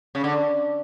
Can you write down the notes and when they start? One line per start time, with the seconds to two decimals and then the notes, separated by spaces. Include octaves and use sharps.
0.15 C#3
0.24 D3